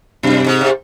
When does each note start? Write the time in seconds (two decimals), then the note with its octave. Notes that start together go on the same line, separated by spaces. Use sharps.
0.23 F#2 C3
0.46 G#2
0.61 C3